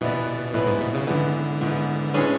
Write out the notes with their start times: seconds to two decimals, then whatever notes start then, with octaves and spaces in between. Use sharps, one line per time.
0.01 B2 E3 B3 E4 B4 D5
0.54 A2 E3 B3 E4 B4 D5
0.67 G#2
0.81 B2
0.95 C#3
1.07 G#2 D3 E3 B3
1.61 G#2 E3 B3
2.14 A2 G#3 C#4 D4 G#4 B4